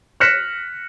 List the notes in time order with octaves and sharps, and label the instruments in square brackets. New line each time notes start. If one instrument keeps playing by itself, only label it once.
[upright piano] F6 F#6 A#6 B6 C#7 E7